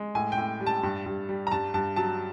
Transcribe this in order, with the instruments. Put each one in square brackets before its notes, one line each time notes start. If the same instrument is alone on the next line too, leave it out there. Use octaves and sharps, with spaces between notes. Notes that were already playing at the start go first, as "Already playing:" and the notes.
Already playing: [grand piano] G#3
A2 G#5
G5
A2
G3
A5
G2
G2
G3
A#5
G2 A5
G2 A5
F#3 A5